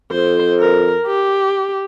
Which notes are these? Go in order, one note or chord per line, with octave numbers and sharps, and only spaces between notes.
F2 C5
A#4
G4